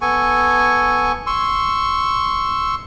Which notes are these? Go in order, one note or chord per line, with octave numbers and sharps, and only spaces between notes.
B3 A4 G#5 C#6
C6 C#6 E6